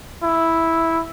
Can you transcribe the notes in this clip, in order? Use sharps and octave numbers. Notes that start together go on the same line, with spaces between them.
E4